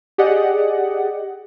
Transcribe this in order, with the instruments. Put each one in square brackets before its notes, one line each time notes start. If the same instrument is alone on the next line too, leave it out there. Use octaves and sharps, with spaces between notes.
[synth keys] G4 G#4 D5 D#5 F#5